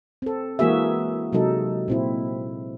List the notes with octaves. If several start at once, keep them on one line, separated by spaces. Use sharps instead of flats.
C4 A4
E3 G#3 A#3 F#4 G#4 E5
C3 F#3 G#3 D#4 A4
A#2 C4 E4